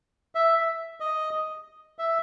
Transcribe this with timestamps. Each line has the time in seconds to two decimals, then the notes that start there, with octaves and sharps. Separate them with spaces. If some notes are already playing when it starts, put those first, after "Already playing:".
0.35 E5
1.00 D#5
1.99 E5